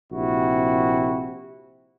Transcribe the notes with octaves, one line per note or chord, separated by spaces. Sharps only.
A#1 C3 E4 F#4